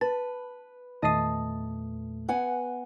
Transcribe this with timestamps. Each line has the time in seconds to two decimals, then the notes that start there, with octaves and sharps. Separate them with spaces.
0.01 B4 A5
1.02 E2 A#2 D#3 A3 D#5 A5 D#6 C7
2.28 B3 F#5 G#5